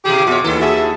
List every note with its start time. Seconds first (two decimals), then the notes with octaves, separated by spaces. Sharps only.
0.05 B2 E3 G4 G#4 D6
0.27 F2 B2 F4 F#4 C#5 E5
0.44 D#2 E3 E4 A4
0.61 F#4 G#4 E5 A5